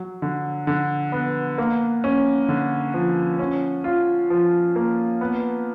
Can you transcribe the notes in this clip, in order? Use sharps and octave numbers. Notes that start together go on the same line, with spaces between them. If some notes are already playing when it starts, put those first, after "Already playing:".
Already playing: F#3
D3
D3
B3
A#3
C#4
D3
F3
C#4
F4
F3
A#3
B3